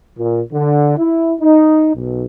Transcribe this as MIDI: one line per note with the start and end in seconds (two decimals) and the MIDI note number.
0.18 0.41 46
0.53 0.96 50
0.98 1.32 64
1.40 1.89 63
1.95 2.25 35